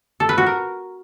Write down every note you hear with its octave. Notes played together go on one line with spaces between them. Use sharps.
A4
B4
F#4
A#4